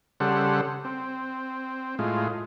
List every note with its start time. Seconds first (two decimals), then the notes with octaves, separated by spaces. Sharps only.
0.20 C#3 G3 A4 C5 F#5
0.84 C4
1.99 A2 G#3 F4